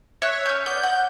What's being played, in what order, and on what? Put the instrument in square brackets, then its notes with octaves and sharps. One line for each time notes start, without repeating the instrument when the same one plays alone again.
[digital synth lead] C#5 [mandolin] E5 F#6
[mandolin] C#4 G6
[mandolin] B3 D5 [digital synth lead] G6
[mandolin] F#5